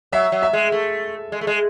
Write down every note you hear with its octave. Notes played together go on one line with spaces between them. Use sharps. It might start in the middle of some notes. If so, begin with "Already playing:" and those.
F#3 E5
F#3
E5
G#3
A3
G#3
A3
G#3